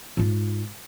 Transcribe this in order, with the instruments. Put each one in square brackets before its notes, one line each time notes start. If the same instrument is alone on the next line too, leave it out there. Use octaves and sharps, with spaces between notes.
[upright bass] G#2 F4